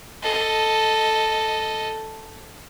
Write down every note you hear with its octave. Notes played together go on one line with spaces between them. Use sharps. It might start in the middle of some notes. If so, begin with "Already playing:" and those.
A4 D#5